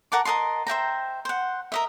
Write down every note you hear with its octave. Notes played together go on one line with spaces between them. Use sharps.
A#4 F#5 A5 D6
A#4 D#5 A5 C6
C5 E5 G5 A#5
C5 F#5
A#4 D#5 E5